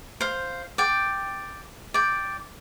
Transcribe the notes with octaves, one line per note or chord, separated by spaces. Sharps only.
C5 F5
D5 G5
D5 G5